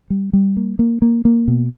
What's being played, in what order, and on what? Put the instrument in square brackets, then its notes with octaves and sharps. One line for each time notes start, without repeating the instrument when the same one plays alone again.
[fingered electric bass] G3
G3
A#3
A#3
A#3
A#3
B2